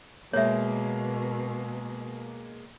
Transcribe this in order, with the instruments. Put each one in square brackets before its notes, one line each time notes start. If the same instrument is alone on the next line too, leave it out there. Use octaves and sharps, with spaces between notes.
[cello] B2 [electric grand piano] G#3 A#3 [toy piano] C#5 E5